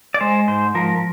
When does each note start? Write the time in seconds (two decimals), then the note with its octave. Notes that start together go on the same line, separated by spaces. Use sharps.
0.14 D5
0.21 G#3 C5
0.48 G#2 C5
0.75 F3 A#4